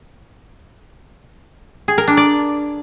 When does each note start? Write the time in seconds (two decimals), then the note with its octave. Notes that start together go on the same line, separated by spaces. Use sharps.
1.88 G#4
1.98 A#4
2.08 D4
2.17 D5